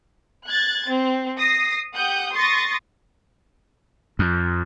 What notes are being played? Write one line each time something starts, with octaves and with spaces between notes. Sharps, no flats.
F#6 G#6 A6
C4
D#6 A#6 C7
G4 F#5 D#6 G6
C6 C#6 D#6 A6 A#6
F2